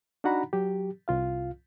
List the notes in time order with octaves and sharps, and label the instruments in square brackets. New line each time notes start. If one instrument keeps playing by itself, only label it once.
[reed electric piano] D4 D#4 F#4 F#5 A#5 B5
F#3 G4
C2 F4 F5